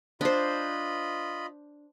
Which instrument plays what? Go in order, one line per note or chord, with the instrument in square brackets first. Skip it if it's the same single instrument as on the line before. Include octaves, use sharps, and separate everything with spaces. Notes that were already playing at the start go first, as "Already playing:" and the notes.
[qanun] D4 C5 [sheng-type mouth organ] F4 D#5 B5